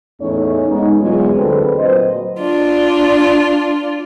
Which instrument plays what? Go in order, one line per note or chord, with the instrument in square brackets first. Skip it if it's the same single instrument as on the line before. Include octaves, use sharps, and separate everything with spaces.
[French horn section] E2 A2 A3 C#4 D#4 C#5
G#3 B3 D#4
E2 B2 F#3 G#3 F4 G#4
D2 D3 C4 A4 B4
A#2 F#3 C5 D#5
[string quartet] D4 F4